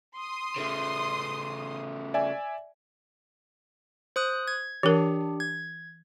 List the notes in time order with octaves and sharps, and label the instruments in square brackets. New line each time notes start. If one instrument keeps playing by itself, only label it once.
[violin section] C6 D#6
[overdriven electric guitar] C#3 A3
[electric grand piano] D5 E5 G#5
[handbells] C5 D#6 F#6
G#6
[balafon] E3 A#4 [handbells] D4 G4
[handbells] G#6